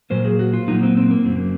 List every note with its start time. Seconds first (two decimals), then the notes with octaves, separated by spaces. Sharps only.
0.10 A#2 F#3 A#3 C5
0.25 G#4
0.39 F#4
0.53 F4
0.68 A#2 F#3 A#3 D#4
0.83 C4
0.97 C4
1.11 A#3
1.25 F#2 C#3 F#3 A#3 C4